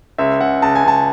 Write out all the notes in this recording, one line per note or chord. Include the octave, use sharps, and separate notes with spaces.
C#2 E5
C#2 F#5
C#2 A5
G#5
C#2 A5